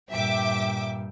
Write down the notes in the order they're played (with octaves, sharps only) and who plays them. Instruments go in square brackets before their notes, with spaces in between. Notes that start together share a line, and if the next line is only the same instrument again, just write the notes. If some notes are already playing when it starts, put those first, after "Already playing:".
[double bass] G2 A#2 [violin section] E5 G5 D6